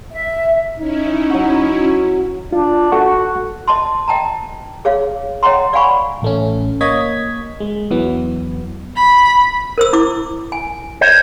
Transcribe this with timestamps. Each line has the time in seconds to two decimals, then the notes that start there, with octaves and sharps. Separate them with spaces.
0.11 E5
0.79 C#4 D#4 E4
1.30 F#3 F#4
2.53 D4 F4
2.92 F#4 A4 F#5 C#6
3.68 D#5 A5 C6
4.08 D#5 G5 A5 A#5
4.85 G#4 C#5 F5
5.43 C#5 D#5 F#5 G5 A#5 C6
5.73 D5 F5 F#5 G#5 B5 C#6
6.22 A1 A3 C#4
6.81 A#3 C#5 D#5 G#6 B6
7.60 G#3
7.91 E2 E3 F#3 B3
8.96 B5
9.78 A#4 C5 E6
9.93 E4 D6
10.52 G#5
11.01 C5 C#5 D#5